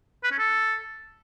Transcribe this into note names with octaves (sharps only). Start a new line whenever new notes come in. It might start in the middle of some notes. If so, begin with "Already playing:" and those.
B4
C#4
A4